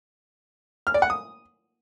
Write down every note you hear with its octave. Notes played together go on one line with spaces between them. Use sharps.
F6
D5
F#5
D#6